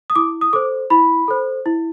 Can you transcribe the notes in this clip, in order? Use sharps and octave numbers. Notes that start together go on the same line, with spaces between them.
D#6
E4 D6
D#6
A4 C5 D6
E4 B5
A4 C5
E4